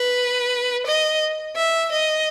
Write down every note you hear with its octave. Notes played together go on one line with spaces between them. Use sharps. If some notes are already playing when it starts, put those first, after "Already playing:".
Already playing: B4
D#5
E5
D#5